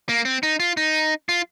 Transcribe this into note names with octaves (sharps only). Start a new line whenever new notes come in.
A#3
C4
D#4
F4
D#4
F4